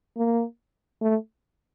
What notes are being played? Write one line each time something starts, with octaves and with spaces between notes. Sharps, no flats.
A#3
A3